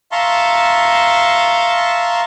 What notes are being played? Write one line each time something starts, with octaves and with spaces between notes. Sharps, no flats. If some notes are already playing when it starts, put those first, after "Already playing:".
E5 F5 A5 A#5 C6 C#6